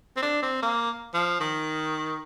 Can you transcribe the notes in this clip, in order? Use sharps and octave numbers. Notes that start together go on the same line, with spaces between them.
C4
D4
C4
A#3
F3
D#3